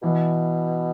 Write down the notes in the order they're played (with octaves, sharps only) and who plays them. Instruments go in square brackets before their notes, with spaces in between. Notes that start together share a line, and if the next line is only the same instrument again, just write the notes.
[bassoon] B2 [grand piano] E3